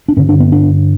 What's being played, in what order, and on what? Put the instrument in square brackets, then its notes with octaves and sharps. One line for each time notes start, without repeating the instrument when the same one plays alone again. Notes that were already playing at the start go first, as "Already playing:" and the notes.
[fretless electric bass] D4
G2 D3 C#4
D4
B3
D4